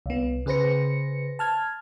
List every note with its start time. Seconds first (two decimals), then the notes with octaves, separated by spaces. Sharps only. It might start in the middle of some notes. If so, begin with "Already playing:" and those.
0.06 C2 B3
0.46 C#3 G#4 B4 C5 A#6 C#7
1.39 A5 F6 G#6